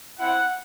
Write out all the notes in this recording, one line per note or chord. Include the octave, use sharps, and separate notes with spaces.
C4 E4 F#5